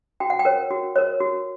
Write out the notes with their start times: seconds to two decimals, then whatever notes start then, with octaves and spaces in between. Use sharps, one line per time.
0.20 F#4 G5
0.30 F#5
0.39 G5
0.45 A#4 C#5
0.71 F#4
0.96 A#4 C#5
1.21 F#4